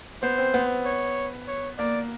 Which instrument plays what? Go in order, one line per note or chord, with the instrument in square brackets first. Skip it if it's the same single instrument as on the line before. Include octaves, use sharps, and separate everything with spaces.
[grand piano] B3 [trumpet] C5
[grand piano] C4
B3
[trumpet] C#5
C#5
[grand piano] A#3 [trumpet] D5